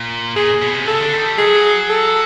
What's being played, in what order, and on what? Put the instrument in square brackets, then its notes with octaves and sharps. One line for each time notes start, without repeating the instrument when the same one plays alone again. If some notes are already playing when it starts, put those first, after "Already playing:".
Already playing: [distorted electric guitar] A#2
[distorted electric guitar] A#2 [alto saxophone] G#4
[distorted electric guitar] B2
C3
[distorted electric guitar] C#3 [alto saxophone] A4
[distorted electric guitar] D3
D#3
G3
[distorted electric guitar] F#3 [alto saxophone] G#4
[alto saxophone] A4